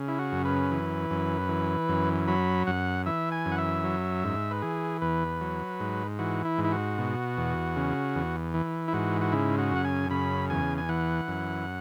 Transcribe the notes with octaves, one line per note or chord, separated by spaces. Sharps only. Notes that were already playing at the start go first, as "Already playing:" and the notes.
Already playing: C#3
E4
F#4
F#2
B4
E3
F#2
E3
F#2
F#3 B5
F#2 F#5
E3 E5
G#5
F#2
F#5
E5
F#3
G#2
B4
E3 G#4
E2 B4
F#3
G#2
E3 F#4
E4
G#2
E4
F#4
B2
E2
C#3
E2
E3
E4
G#2 F#4
F#4
C#3 E4
F#4
F#2 F#5
G#5
C#3 B5
E2 G#5
G#5
E3 F#5
F#2